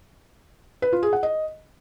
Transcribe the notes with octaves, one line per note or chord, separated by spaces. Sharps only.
B4
F4
G#4
F#5
D#5